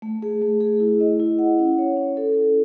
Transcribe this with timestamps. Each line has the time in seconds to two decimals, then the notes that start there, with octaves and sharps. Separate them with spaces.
0.02 A3
0.22 G#4
0.42 A3
0.60 G#4
0.80 E4
1.00 D#5
1.20 E4
1.39 F#5
1.59 C#4
1.78 C#5
1.97 C#4
2.17 A4
2.36 E4